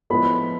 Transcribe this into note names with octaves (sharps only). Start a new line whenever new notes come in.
A2 F3 G#3 B3 B5